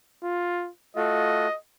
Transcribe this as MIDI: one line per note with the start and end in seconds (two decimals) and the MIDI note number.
0.23 0.69 65
0.96 1.47 57
0.96 1.47 65
0.96 1.47 66
0.96 1.56 75